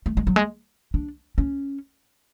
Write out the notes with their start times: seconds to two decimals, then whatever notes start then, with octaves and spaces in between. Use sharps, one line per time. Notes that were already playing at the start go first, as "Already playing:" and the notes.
0.06 A3
0.17 G#3
0.27 F#3
0.36 G#3
0.94 D4
1.38 C#4